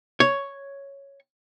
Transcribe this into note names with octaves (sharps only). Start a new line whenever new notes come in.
C#5